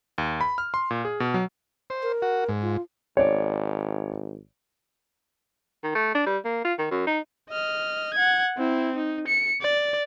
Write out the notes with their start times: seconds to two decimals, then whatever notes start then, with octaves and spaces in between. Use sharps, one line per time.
0.18 D#2
0.41 B5
0.58 F6
0.74 C6
0.91 A#2
1.05 G#4
1.20 B2
1.34 F#3
1.90 C5
2.03 A#4
2.22 F#4
2.49 G#2
2.62 F4
3.17 G#1 C#5 D5
5.83 D#3
5.95 A3
6.15 D4
6.26 G3
6.45 A#3
6.65 F4
6.78 D#3
6.91 F#2
7.07 D#4
7.50 D#5 F6
8.14 F#5 G#6
8.57 C4 E4
8.96 D#4
9.27 C#7
9.61 D5